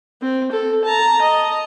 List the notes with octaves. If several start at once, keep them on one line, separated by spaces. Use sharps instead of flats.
C4
A4
A5 A#5
D#5